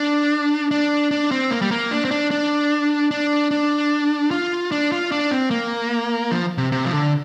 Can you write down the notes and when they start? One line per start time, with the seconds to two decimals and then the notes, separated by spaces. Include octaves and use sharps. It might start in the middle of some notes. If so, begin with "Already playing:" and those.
Already playing: D4
0.71 D4
1.11 D4
1.31 C4
1.51 A#3
1.62 G3
1.71 A#3
1.91 D4
2.05 C4
2.11 D4
2.31 D4
3.11 D4
3.51 D4
4.31 F4
4.72 D4
4.92 F4
5.12 D4
5.31 C4
5.51 A#3
6.31 F3
6.58 C3
6.72 C3
6.85 F3
6.91 D3